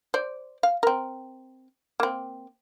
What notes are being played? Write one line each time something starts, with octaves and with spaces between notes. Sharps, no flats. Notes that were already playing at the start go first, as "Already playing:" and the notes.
C5 D5
F5
C4 A#4
A#3 C4